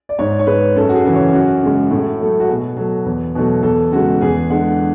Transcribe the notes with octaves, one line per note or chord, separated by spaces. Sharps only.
D5
G#2 C#5
C#5
G#3 B4
F#2 A4
F#4
G#4
C#3 E3
C#5
F#2 F#4
C#3 G#3
A2
F#3 A3
F#4
B2 G#4
F#3 A3
E2
B2 F#3 A3
E2 A4
C#3 G#3 F#4
E2 G#4
D3 G#3 F#5